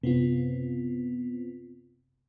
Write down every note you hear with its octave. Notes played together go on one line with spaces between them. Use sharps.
F#1 C3 B3 C4 F4